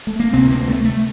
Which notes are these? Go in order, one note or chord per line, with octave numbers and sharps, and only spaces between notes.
A3
A#3
D2 C3 C4
A#3
A3
A3